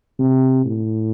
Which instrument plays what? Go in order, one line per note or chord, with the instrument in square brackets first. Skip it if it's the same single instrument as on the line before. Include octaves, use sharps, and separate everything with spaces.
[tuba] C3
A2